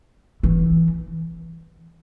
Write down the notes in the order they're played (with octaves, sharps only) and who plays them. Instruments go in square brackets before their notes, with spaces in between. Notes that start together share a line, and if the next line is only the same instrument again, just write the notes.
[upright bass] E3